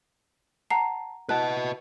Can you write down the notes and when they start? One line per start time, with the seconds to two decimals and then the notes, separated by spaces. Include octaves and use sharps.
0.70 F#5 A5 A#5 C7
1.29 E4 F#4 B4 D#5 A5 F#6